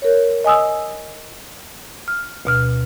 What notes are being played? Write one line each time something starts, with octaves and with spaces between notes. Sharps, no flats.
A#4 C#5
D#5 G#5 D#6 E6
F6
D2 B2 F6